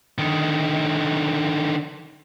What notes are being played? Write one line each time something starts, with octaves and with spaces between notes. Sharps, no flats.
D3 D#3